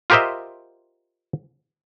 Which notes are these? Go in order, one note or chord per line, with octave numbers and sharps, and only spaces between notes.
F4 G4 A#4 C5 D#5 E5